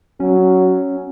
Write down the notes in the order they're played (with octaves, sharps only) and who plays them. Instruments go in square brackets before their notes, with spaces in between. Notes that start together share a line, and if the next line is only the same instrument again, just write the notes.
[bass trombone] F#3 [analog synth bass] C#4